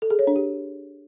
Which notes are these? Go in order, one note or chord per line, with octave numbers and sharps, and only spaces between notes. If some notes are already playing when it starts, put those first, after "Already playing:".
A4
G#4
C#5
D4
G4